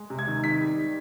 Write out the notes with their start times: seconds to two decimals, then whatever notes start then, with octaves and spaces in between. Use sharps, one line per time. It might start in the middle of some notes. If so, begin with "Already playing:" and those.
Already playing: G#3
0.10 C3
0.19 G#6
0.28 D#3
0.44 D#3 B6
0.61 G3